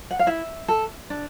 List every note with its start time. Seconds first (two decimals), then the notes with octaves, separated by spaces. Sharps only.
0.11 F#5
0.19 F5
0.27 E4 E5
0.68 A4
1.10 D4